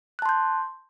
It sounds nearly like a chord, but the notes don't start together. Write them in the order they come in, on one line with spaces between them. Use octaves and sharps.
F#6 A5 C6 G6